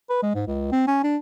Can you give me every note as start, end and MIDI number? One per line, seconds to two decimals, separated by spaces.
0.10 0.20 71
0.23 0.34 56
0.35 0.43 44
0.47 0.71 37
0.72 0.83 60
0.87 0.99 61
1.04 1.17 62